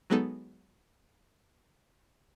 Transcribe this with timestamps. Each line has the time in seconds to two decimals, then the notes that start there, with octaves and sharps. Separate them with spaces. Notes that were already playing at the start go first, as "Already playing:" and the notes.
0.10 F#3 G#3 B3 D#4 A4